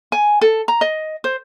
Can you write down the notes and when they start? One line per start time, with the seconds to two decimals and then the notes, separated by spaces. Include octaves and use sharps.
0.12 G#5
0.41 A4
0.68 A#5
0.81 D#5
1.24 C5